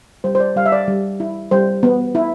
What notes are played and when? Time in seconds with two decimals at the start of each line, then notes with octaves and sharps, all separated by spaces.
0.24 G3 C5
0.35 C5
0.40 D5
0.56 G3 F5
0.66 E5
0.72 D5
0.88 G3
1.20 E4
1.51 G3 C5
1.83 B3
2.15 E4